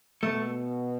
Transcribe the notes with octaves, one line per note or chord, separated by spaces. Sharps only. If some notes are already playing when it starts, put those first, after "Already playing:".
B2 A3